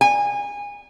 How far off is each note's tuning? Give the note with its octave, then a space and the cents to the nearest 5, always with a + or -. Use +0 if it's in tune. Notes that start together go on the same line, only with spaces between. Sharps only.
G#5 -25